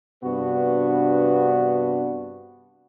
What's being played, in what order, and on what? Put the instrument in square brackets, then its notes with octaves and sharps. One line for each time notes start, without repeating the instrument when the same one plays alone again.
[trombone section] G2 C3 B3 D4 F#4 B4